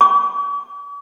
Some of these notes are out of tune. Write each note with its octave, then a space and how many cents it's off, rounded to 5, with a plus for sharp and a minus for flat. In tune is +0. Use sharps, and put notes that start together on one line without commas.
D6 -45